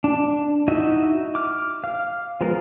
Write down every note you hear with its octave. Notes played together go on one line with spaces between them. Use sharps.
D4
D#4 E4 F#4 D#5 E5
D6 F6
F5
F3 G#3 B3 F4 A#4